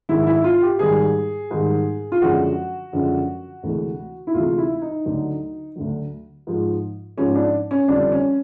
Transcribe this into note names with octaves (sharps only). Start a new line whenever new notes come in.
G#2 D#3 F#3 E4
E4
F4
G4
G#2 D#3 G3 G#4
G#2 D#3 G3
F4
F#2 D3 F3 G#3 F#4
F#2 D3 F3 G#3
D2 C3 E3 G#3
E4
D2 C3 E3 G#3 F4
E4
D#4
D2 D3 F#3
D2 D3 F#3
G#2 F3 G#3
G#2 F3 G#3 C#4
D4
C#4
F2 D3 G3 D4
C#4